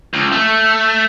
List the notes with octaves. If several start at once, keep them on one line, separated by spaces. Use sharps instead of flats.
C#2
A3